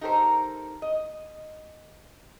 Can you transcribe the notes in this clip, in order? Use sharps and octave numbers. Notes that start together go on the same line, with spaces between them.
D#4 G4 A4 A#4 C5
D#5